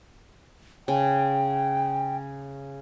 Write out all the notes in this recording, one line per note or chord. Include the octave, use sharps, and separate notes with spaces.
C#3 G5